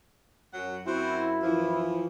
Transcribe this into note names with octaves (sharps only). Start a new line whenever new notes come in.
F#2 F#3 F#5
F#2 C4 E4 F#4
E3 F3